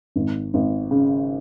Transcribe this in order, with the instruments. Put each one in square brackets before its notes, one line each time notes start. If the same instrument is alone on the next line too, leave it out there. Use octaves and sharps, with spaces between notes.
[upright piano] G#1
G#1
C#3